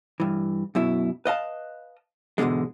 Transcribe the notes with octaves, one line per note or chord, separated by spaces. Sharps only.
G2 E3
F#2 B2 E4
B4 D#5 F5 A5
E2 G#2 B2 D3 G#3